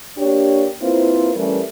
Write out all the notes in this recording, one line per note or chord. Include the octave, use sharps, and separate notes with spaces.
A#3 D4 G4 C#5
A#3 C4 E4 F4 B4 C5
E3 G3 A3 C#4 A#4